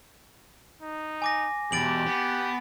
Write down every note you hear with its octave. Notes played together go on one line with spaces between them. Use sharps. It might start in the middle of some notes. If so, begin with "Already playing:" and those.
D#4
G#5 D6 A#6
E2 B2 G4 A6 D7 F#7
B3